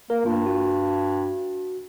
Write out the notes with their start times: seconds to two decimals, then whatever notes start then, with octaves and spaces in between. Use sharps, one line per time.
0.10 A#3 A#4
0.25 G2 A#3 F4
0.46 F#4